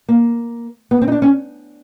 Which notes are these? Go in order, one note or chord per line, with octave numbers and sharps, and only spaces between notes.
A#3
B3
C4
D#4
D4
C#4